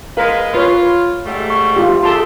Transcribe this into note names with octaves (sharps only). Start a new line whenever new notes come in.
G#3 A#4 B4 F5
F4 B4 C#5
G#2 G3 A3
C#6
F4 G4
A3 G4 G#4 A5 C6